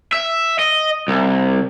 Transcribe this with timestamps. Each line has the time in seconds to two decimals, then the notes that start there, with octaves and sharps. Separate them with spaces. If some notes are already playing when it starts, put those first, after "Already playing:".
0.13 E5
0.59 D#5
1.08 C2